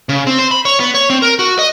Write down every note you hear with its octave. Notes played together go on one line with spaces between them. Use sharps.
C#3
C4
C5
B5
C#5
B3
C#5
C4
A#4
F#4
D#5